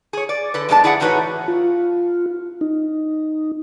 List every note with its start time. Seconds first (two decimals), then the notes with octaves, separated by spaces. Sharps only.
0.13 G#4 C#5
0.29 D5
0.54 D3 A4 B4
0.69 F2 G#3 B3 D4 E4 A5
0.84 E4 G#4 D5 E5 F#5
1.00 A2 E3 D#4 F#4 B4 C#5
1.48 F4
2.61 D#4